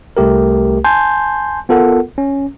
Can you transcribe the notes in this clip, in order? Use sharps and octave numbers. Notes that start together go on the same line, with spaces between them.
C2 A3 G4 A#4
G#5 A5 C6 G6
B3 F4 A4 A#4 F#5
C#4